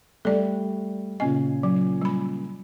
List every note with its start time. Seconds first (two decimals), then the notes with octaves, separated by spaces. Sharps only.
0.25 G3 A3 A4 D5
1.20 A#2 C#3 D#5 G#5
1.63 F#3
2.01 G3 B5